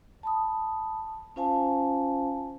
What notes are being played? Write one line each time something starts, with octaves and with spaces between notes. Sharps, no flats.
A5 B5 D#6
C#4 F4 C5 F5 G#5 A5